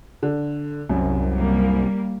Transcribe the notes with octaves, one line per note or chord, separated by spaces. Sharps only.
D3
C2 F#2
G3 A#3